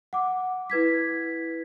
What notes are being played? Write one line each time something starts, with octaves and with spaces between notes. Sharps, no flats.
F#5 D6
E4 B4 G#6 B6